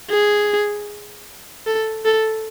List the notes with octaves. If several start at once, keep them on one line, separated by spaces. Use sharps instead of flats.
G#4
A4
A4